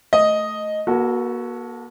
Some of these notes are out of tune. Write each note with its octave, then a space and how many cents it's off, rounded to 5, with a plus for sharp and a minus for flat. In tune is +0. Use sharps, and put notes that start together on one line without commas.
A3 +0 D#5 +0
A#3 +40 F#4 +0 A4 +0